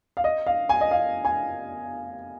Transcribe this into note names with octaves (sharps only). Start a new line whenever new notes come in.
F5
D#5
F5
G#5
D#5
F5
G#5